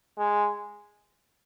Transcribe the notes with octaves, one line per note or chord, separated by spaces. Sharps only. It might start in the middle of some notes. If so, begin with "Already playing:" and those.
G#3